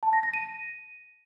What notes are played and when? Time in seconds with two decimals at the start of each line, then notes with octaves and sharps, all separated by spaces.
0.03 A5
0.13 A#6
0.23 A#6
0.34 D#7